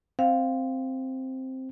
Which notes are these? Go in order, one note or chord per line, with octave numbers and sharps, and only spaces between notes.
C4 F5